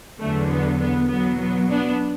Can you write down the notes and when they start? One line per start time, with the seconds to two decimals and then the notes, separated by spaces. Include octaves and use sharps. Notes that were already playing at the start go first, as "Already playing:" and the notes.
0.19 E2 D3 F#3 A3
0.50 B3
0.79 B3
1.09 E2 B2 F#3 B3
1.40 B3
1.69 B3 D4